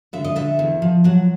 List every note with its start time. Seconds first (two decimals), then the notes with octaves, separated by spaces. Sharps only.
0.13 D3 E5
0.24 D#5
0.36 D3 E5
0.59 E2
0.82 F3
1.04 F#3 F#5